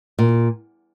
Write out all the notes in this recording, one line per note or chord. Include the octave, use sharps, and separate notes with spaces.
A#2